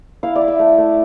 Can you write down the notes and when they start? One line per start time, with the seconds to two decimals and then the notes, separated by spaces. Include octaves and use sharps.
0.23 E4 F5
0.36 D5
0.41 E4
0.48 E5
0.59 A3
0.78 A3